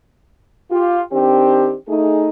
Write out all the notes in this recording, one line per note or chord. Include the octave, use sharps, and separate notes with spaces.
F4 G4
D#3 C4 D4 G4
A3 D#4 G#4